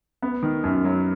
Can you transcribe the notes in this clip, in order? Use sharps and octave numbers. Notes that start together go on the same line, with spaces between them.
B3
D#3
F#2
F#3